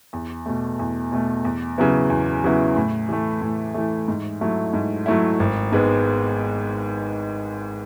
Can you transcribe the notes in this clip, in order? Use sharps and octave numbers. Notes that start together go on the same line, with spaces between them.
E2
B2 A3
E2
B2 A3
E2
C#3 F#3 B3 E4
E2
C#3 F#3 B3 E4
A2
E3 A3
A2
E3 A3
G#2
F#3 A3 E4
G#2
F#3 A3 E4
G#1
G#2 G#3 B3